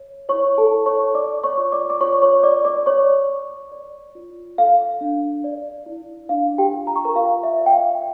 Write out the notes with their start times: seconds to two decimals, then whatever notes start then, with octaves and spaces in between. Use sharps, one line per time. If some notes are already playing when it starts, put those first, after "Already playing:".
Already playing: C#5
0.29 E4 C#5 C#6
0.58 A4 A5
0.72 E4
0.86 C#5 C#6
1.15 C#5 D5 D6
1.44 C#5 C#6
1.58 F4
1.72 D5 D6
1.90 D6
2.01 F4 C#5 C#6
2.22 C#5 C#6
2.43 C#5 D5 D6
2.65 D5 D6
2.86 C#5 C#6
3.29 C#5
3.72 D5
4.15 F4
4.58 A4 F5
5.01 D4
5.44 D5
5.86 E4
6.29 D4 F5
6.58 G4 G5
6.73 F4
6.87 A#5
6.96 C#6
7.05 A#4 A#5
7.15 F4 F5
7.44 E5
7.58 D5
7.66 G5
7.73 F5